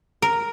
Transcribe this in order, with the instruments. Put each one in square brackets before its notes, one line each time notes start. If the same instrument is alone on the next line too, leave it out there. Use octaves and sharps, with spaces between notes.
[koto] A#4